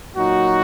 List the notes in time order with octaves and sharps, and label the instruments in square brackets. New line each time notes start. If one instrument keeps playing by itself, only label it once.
[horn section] A#2 F#3 D#4 F#4